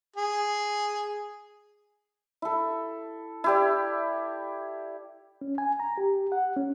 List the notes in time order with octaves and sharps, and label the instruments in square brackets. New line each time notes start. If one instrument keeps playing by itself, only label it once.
[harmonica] G#4
[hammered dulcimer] E4 A4
E4 G4 D5
[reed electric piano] C#4
G#5
A#5
G4
F#5
C#4